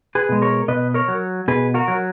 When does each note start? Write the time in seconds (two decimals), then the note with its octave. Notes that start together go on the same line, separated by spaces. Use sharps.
0.15 G#4 B4
0.29 B2 G#3
0.42 A#4 C#5
0.68 B2 B4 D#5
0.94 A#4 C#5
1.08 F#3
1.48 B2 G#4 B4
1.74 F#4 A#4
1.88 F#3